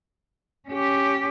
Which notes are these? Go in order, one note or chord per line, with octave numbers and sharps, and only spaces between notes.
C#4 G4